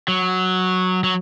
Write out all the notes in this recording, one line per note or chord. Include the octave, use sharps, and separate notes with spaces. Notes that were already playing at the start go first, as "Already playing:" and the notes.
F#3
F#3